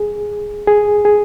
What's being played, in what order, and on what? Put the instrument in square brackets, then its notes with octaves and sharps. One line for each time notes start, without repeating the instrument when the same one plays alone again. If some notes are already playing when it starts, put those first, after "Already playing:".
Already playing: [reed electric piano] G#4
G#4
G#4